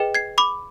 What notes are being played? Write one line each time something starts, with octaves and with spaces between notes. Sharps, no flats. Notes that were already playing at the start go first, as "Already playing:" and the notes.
Already playing: G#4 B4 D#5 G5
G#6 C7
B5 D6